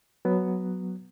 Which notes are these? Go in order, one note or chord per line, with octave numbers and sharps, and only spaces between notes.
F#3 B3